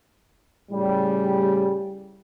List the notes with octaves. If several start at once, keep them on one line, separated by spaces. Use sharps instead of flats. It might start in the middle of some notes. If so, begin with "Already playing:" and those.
A2 C#3 G3